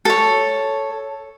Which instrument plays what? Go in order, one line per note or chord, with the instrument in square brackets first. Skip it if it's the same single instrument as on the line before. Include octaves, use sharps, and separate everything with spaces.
[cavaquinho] A4 C#5